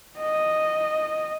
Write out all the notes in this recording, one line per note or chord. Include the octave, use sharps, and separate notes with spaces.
D#5